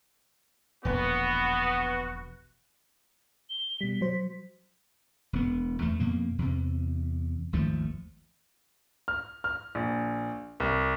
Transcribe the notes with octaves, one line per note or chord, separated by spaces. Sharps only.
E1 A#1 B3 F#4
G7
B2 G3 B6
F#3 C5
E1 B3
E2 A3
F2 B2 A#3
E2 C3
G#1 D#2 F3 A3
F6
F6
A#1
C2